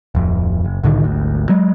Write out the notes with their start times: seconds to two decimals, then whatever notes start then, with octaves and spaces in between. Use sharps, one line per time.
0.15 D1 F2
0.64 F#1
0.83 C2 A2 D3 D#3
1.04 G#1 D2
1.49 F#3 G#3